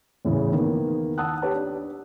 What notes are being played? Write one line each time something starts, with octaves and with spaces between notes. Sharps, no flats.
E2 A2 C#3 E3
D#3 A#3 B3
F#5 A5 D#6 E6 F#6
G4 B4 C#5 A5
D4